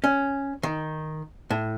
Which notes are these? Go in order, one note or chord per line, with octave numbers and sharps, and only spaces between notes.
C#4
D#3
A2